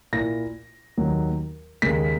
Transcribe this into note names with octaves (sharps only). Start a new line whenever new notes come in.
A#2 A#3 E4 A#6
D#2 D#3 F#3
D#2 C#3 G#3 B6